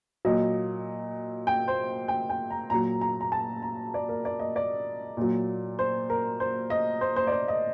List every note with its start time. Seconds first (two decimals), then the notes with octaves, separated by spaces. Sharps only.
0.25 A#2 F#3 D#5
1.47 G5
1.68 C5
2.08 G5
2.30 G5
2.50 A#5
2.70 A#2 F#3 A#5
3.01 A#5
3.21 A#5
3.32 A5
3.62 A#5
3.94 D5
4.09 A#4
4.25 D5
4.39 D#5
4.56 D5
5.17 A#2 F#3
5.79 C5
6.10 A#4
6.40 C5
6.70 D#5
7.01 C5
7.16 C5
7.27 D5
7.32 C5
7.48 D#5